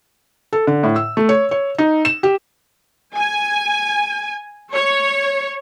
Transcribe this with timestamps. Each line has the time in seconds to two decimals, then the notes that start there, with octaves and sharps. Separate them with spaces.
0.53 A4
0.67 D3
0.83 A2
0.96 E6
1.17 A3
1.29 C#5
1.51 C#5
1.78 D#4
2.05 E7
2.23 G4
3.16 G#5
4.75 C#5